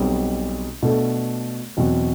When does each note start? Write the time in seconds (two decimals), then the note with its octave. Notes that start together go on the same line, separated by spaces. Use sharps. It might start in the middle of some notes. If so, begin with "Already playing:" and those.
Already playing: B1 B2 G3 C4
0.83 B2 A3 D4 A4
1.77 E2 B2 F#3 C4 F#4